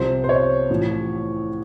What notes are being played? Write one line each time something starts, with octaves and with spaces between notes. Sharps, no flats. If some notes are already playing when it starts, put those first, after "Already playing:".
Already playing: C2 C3 F3 C5
C5
C#5
A1 A2 F3